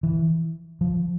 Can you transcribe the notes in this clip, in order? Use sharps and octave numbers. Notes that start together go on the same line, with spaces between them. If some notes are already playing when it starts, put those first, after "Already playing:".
E3
F3